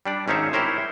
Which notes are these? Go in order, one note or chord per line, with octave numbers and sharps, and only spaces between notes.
G3 D4 D5
G#1 C#4 D#4 C5 C#5 E5
E4 G4 A#4 C5 C#5